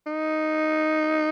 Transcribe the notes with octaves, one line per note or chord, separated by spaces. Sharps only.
D#4